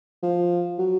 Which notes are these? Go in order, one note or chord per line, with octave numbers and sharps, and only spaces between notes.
F3
F#3